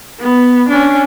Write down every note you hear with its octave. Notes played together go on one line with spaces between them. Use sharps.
B3
C#4 D4